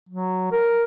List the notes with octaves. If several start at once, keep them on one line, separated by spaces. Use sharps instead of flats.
F#3
A#4